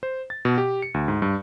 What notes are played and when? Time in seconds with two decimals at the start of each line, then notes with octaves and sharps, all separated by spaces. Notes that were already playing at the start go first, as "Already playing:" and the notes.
0.03 C5
0.30 A6
0.45 B2
0.58 G4
0.82 C#7
0.94 D2
1.08 G#2
1.22 G2